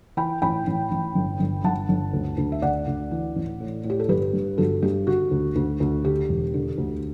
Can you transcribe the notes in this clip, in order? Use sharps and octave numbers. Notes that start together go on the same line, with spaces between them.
E3 G5 B5
A1 G5 B5
A1
A1
G1
G1
G1 F#5 A5
G1
D2
D2
E5
D2 D5 F#5
D2
E3
A1
A2
A2
G4
A4
G1 G4 B4
G2
G1 F#4 A4
G2 G4
D3 F#4
D2
D2
D2
D3 G4
E1
D3
D2